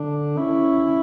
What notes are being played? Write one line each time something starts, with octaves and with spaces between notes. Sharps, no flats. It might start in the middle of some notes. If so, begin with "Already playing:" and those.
Already playing: D3 D4
C#4 E4